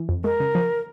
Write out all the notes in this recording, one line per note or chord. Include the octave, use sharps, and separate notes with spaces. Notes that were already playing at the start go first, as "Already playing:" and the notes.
Already playing: E3
F2
G#3 A#4
C#3
F3